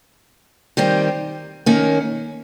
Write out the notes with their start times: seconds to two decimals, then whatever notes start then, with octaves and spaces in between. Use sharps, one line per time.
0.77 D#3 G3 C4 G4
1.66 D#3 A#3 C#4